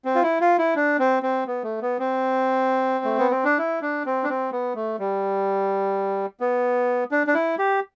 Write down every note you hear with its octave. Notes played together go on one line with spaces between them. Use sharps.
C4
F4
E4
F4
E4
D4
C4
C4
B3
A3
B3
C4
A3
B3
C4
D4
E4
D4
C4
D4
C4
B3
A3
G3
B3
D4
D4
E4
G4